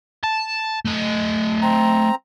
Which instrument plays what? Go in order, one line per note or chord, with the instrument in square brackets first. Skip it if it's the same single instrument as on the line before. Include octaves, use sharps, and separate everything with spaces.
[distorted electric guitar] A5
A3 D#5
[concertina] C4 A#5